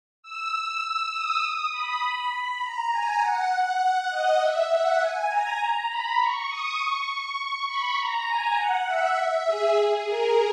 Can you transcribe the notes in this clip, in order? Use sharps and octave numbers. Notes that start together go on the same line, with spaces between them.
E6
D#6
B5
A#5
G#5
F#5
D#5
E5
F#5
G#5
A#5
A#5
B5
C#6
D#6
C#6
B5
A#5
G#5
F#5
E5
E5
G#4
G#4
A#4